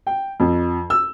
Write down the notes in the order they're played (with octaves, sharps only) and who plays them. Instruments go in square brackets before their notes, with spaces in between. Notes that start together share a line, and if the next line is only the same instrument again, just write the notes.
[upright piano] G5
F2
E6